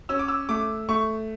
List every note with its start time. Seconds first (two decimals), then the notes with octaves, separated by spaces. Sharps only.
0.09 C#4 E6
0.19 D6
0.28 E6
0.49 A3 D6
0.89 A3 C#6